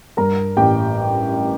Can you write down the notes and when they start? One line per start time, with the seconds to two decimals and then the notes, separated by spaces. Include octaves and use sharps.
0.17 G2 A#4 A#5
0.57 A1 G4 G5